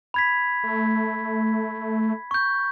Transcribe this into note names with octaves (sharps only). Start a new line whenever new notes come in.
B5 G#6 B6
A3
C#6 G6